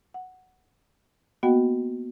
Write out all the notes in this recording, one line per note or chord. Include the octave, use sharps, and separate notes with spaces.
F#5
A#3 B3 F#4 D#5 F#5 G5